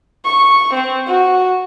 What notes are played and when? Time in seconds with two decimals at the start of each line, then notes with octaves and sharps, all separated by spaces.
0.25 C#6
0.74 C4
1.07 F#4